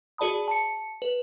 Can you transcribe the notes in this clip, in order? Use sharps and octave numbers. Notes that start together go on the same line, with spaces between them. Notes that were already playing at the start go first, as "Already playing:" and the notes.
F#4 G#4 D5 A5 B5 D#6
A5 C#7
B4